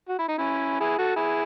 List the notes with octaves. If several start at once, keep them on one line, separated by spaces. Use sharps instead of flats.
F#4
E4
D#4
C#4 E4
E4 G#4
F#4 A4
E4 G#4